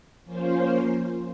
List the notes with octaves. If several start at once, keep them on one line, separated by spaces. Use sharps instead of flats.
F3 A#3 C#4 F4 C5